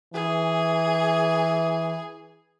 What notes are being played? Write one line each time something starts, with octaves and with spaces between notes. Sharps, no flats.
E3 G#4